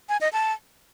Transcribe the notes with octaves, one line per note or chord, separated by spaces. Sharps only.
G#5
D#5
A5